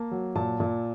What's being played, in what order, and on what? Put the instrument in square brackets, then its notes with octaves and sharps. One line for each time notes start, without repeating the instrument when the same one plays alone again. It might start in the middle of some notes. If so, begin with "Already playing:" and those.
Already playing: [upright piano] A#3 A5
F#3
A#2 A5
A#2